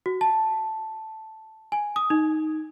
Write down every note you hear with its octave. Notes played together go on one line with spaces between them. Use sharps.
F#4
A5
G#5
D#6
D#4